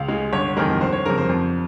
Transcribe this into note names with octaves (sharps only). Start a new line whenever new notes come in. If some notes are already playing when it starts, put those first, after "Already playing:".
Already playing: C#2 F5
C#3 G#3
G1 C#5
F2 D#3 G#3 A#4
G1 C5
C#5
F2 C#3 A#4
C5
F2